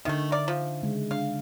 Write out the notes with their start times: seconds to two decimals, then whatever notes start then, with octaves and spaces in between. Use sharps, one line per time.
0.05 D3 D#3 A3 D#4 E5
0.32 A#4 D5
0.48 F3
0.83 C#3 G#3
1.11 D4 F5